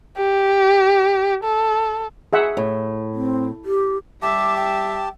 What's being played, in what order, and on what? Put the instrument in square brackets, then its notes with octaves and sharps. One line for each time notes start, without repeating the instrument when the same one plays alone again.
[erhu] G4
A4
[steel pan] G#4 E5 F#5
[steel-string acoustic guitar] A2
[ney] C4
G4
[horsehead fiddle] G3 E5 [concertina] G4 A5 [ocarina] D6
[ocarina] G5